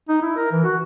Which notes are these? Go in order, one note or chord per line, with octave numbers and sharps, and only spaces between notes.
D#4
E4
A#4
E3
F#4